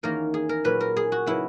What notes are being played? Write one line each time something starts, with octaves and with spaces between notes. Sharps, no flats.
E2 D#3 A#3 C#4 A#4
G#4
A#4
A#2 F#3 C#4 B4
A#4
G#4
F#4
C#3 F#3 B3 E4